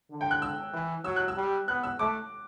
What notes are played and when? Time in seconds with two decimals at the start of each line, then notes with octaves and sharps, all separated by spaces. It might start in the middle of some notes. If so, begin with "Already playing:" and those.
0.10 D3
0.21 G5
0.31 F#6
0.42 E6
0.73 E3
1.04 F#3 E6
1.16 F#6
1.28 E6
1.36 G3
1.68 B3 F#6
1.83 E6
1.99 A3 D6